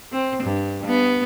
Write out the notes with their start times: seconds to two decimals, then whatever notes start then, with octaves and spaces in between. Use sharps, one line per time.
0.12 C4
0.43 G2
0.86 B3